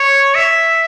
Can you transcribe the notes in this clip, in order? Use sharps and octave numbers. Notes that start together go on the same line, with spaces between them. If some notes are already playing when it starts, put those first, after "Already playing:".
Already playing: C#5
E5